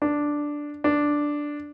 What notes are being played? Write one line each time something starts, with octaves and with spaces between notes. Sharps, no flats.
D4
D4